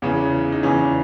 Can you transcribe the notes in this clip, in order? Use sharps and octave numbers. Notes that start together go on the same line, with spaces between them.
E2 C#3 E3 C#4
D#4
E2 C#3 E3 C#4